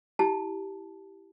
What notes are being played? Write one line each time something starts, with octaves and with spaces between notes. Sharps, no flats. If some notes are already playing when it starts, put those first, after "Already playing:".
E4 G4 A5